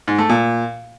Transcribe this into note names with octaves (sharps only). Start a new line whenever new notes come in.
G#2
A3
A#2